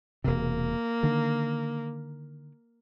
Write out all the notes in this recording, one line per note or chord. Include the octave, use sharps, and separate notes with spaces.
E1 C3 A#3
D3 D#3